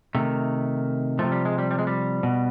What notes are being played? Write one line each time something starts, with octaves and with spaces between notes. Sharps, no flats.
C3 D#3 A3
C3 F3 A3
G3
G#3
G3
G3
G#3
G3
B2